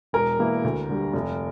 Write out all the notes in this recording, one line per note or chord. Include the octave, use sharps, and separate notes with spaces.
E1 A#4
E2 E3 A#3 E4
D2
D3 G3
F1